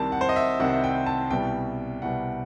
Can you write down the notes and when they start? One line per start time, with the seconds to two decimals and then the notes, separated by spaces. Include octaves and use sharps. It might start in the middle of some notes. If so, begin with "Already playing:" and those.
Already playing: C2 C3 D#3 G3 C4 A5
0.12 F#5
0.21 C5
0.29 D#5
0.36 E5
0.59 C2 C3 D#3 G3 C4 F#5
0.84 G5
1.06 A5
1.31 C2 B2 G3 G5
2.02 C2 B2 G3 F#5